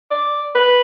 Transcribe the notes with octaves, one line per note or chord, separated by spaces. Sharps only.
D5
B4